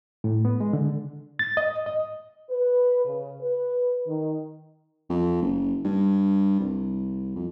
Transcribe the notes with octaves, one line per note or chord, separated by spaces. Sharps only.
A2
B3
G#3
D3
A6
D#5
D#5
B4
C#3
B4
D#3
F2
F#1
G2
C2
F2